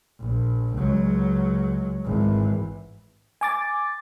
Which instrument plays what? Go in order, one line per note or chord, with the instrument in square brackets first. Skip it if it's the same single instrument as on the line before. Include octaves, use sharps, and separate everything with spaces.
[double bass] A#1
C#2 F#3
G#1 E3
[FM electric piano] G#5 D6 A6